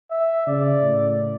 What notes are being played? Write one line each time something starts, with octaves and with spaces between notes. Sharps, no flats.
E5
C#3 D5
A2